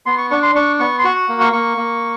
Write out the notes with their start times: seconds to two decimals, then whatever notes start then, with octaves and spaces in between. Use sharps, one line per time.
0.06 B3 C6
0.18 C#6
0.31 D4 C#6
0.43 C6
0.55 D4 C#6
0.79 B3 C#6
0.99 C6
1.04 F#4 C#6
1.29 A#3
1.41 C#6
1.53 A#3 C#6
1.77 A#3